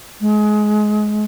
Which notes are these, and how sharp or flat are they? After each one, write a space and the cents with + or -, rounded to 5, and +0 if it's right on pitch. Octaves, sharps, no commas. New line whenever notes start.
G#3 +25